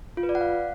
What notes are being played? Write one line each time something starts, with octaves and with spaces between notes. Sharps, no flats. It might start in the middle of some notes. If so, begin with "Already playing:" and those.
F4
B4
D5
F#5
F5